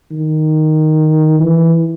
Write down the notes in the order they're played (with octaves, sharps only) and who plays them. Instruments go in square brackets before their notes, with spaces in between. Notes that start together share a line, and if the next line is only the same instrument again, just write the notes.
[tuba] D#3
E3